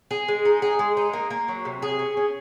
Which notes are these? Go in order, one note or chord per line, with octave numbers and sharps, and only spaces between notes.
G#4
G#3
D#4
G#4
G#3
D#4
A#3
A#3
F#3
C3
G#4
C#4
C#4